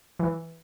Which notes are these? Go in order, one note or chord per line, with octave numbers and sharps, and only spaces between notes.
E3